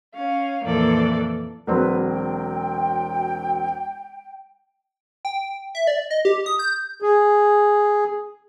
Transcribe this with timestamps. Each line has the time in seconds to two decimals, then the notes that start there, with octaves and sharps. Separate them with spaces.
0.13 C#4 F5
0.63 F2 A#2 E3 A#3 A4 D5
1.67 E1 F#3 C4 B4
2.08 G5
5.25 G5
5.75 E5
5.87 D5
6.11 D#5
6.25 G4
6.46 D#6
6.59 G6
7.02 G#4